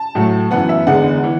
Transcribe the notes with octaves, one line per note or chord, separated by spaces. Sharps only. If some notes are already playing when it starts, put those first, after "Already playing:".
Already playing: A5
A2 F#3 A3
F#2 E3 B3 F#5
E5
E2 D3 G#3 B3 F#5
E3